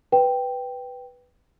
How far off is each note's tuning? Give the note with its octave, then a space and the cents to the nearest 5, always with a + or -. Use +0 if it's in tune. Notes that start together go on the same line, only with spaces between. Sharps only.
B4 +0 G5 +0